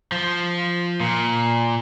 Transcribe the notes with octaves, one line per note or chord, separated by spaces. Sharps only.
F3
A#2